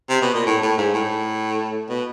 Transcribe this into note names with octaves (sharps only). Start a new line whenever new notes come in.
C3
B2
A#2
A2
A2
G#2
A2
B2